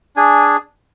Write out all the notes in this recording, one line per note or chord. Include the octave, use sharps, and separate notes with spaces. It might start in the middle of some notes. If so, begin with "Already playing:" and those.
D4 G#4 G#5